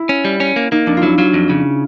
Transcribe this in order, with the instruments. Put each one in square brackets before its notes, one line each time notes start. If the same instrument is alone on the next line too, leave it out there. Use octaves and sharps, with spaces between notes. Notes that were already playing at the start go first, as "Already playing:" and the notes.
Already playing: [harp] E4
[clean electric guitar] C#4
G3
C#4
A#3
[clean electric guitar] A#3 [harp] D#4
[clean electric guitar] F2 [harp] D4
[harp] F4
[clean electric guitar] F#3 [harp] E4
[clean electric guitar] F#3 [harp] F4
[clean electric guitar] F2
C#3